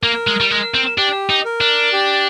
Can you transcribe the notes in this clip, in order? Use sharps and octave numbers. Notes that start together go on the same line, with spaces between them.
A#3 A#4
G#3
G3
G#3 A#4
C4
D4 G4
D#4
A#4
D4
G4